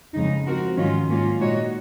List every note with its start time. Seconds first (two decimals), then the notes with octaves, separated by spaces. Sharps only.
0.14 F2 C#3 G#3 D#4
0.45 F3 C4 F#4 A#4
0.77 G#2 D#3 F#3 C#4 F4
1.08 G#2 F#3 A#3 C#4 F4
1.39 A#2 G#3 D#4 F#4 C#5